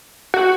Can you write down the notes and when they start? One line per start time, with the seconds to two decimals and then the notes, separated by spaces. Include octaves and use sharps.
0.34 F#4